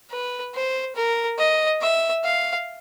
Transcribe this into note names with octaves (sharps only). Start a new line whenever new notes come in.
B4
C5
A#4
D#5
E5
F5